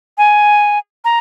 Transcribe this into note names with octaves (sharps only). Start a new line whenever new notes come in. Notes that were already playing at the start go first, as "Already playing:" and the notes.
G#5
A#5